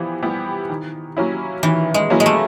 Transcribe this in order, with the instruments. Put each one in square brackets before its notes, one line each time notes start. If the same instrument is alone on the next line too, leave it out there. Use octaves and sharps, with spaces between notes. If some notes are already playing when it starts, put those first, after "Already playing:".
Already playing: [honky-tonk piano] E3 G3 B3 E4 G4 [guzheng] F3
[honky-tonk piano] G3 B3 E4 G4
D#3
F#3 A#3 C#4 E4
[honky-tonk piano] D#3 [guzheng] E3
[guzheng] G#3
[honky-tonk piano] F#3 A#3 C#4 E4
[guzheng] G#3
A3